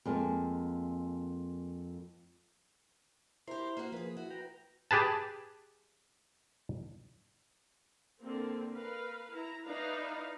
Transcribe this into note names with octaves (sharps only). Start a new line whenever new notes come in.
F2 G#3 A#3
E4 G4 A#4 C5 C6
A#3 F#4
F3 A#3 G#4 B4
E4 F#4
B4 G5 A#5
G4 G#4 B4 A5
D3 A#3 C4
A#4 B4 F5
E4 A#5
D#4 E4 B4 D5 F5 A#5